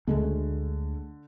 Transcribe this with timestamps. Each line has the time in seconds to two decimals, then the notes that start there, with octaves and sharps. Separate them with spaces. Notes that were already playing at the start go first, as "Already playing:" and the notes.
0.08 D2 D3 G#3 A3